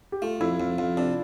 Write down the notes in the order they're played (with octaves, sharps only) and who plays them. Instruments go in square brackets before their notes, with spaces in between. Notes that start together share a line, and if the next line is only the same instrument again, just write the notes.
[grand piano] G4
[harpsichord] A3 [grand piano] F4
[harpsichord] F2 [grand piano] E4
[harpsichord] F2 [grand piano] F4
[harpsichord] F2 [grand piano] F4
[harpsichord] C3 [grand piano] D4